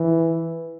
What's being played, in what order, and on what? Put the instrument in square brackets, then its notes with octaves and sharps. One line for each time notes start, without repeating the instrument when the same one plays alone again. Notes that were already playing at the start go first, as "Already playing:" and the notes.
Already playing: [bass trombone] E3